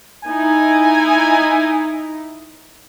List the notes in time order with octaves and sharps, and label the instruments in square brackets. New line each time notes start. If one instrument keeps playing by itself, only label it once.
[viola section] D#4 E4 [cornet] G#5